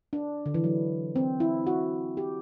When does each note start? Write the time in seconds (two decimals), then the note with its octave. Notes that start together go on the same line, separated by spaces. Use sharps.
0.13 D4
0.46 D3
0.54 E3
0.64 F#3
1.16 C4
1.40 E4
1.67 F#4
2.17 G4